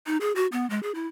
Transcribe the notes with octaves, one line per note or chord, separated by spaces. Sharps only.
D#4
G#4
F#4
B3
G#3
G#4
E4